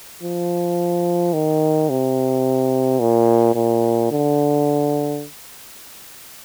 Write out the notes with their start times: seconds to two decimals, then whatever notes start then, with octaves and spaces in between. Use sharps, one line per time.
0.23 F3
1.33 D#3
1.90 C3
3.00 A#2
3.55 A#2
4.11 D3